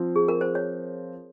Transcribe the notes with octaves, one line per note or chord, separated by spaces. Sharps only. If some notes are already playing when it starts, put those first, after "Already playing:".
Already playing: F3 C4 F4
G#4
A#4
C5
C#5